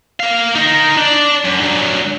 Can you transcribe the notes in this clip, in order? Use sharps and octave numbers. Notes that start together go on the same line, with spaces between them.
A#3 F5
D#4 A#4
D4 D5
F#2
G2 F#3